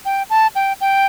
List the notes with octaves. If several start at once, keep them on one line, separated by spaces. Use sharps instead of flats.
G5
A5
G5
G5